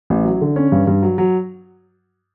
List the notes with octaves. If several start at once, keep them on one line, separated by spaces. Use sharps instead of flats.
A1
F#3
D3
C#4
G2
G2
F#3
F#3